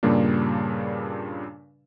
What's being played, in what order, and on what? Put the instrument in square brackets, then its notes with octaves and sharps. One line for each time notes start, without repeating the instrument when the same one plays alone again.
[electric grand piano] G2 A#2 C#3 G3 A#3 D4